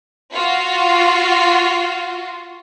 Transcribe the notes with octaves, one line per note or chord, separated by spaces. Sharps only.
F4 F#4